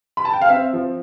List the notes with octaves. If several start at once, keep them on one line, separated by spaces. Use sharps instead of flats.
B5
A5
G5
F5
C4 E5
F3